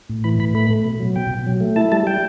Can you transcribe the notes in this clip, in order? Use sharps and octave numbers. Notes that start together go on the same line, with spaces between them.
A2
E3 B5
A2 B5
A3 B5
A3
B2
F#3
B2 G5
B2
F#3
A3
E4 A5
G3 A5
G3 G5